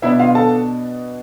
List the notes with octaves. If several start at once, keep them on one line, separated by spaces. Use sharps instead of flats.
B2 B3 D4 E4 E5
F4 F5
A4 A5